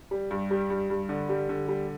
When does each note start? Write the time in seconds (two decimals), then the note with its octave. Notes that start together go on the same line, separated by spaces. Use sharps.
0.11 G3
0.31 G2
0.51 G3
0.70 G2
0.90 G2
1.09 D3
1.29 G3
1.49 D3
1.69 G3